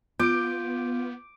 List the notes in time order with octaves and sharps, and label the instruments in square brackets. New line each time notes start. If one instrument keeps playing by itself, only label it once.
[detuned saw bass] B3 [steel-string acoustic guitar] F4 [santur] D6 [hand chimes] G6 D7